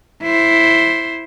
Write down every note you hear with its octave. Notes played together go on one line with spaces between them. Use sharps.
E4 C5